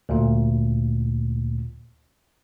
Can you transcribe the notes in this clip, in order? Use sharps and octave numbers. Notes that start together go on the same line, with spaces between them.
D2 A#2